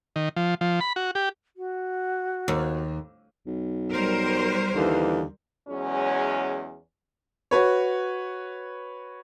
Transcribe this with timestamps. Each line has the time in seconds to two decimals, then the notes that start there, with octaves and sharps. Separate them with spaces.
0.16 D#3
0.36 F3
0.61 F3
0.81 B5
0.96 F#4
1.15 G4
1.56 F#4
2.48 D#2
3.46 B1
3.92 G3 A#4 C5
4.73 D#2 D3 E3
5.68 E2 F#3 G#3 C#4
7.51 F#4 B4 C#5